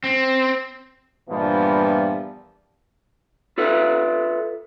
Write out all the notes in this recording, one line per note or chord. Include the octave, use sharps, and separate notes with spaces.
C4
G2 A#2 E3 F3 G3 B3
F4 A4 B4 E5